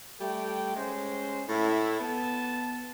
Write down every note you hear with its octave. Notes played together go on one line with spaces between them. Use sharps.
G3 A3 G5
G#3 C#4 C5
A2 E4
B3 A5